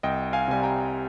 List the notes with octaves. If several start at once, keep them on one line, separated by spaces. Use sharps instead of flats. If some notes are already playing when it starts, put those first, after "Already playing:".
C2 D#5 G5
F5 G#5
C3 G3 G#5
G5 A#5